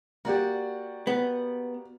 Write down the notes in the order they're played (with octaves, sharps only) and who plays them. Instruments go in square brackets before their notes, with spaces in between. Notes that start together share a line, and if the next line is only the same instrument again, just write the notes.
[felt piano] A#3 G4 [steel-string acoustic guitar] F#4 D5 F#5
[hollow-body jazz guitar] B3